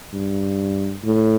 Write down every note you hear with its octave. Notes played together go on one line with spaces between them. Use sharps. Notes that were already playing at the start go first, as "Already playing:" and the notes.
G2
A2